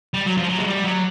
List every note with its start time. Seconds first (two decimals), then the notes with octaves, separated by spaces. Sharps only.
0.14 G3
0.26 F#3
0.37 F3
0.50 F#3
0.59 G#3
0.67 G3
0.84 F#3